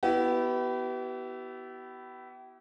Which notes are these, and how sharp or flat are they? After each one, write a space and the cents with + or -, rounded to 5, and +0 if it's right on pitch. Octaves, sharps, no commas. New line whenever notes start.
B3 +0 E4 +0 G4 -40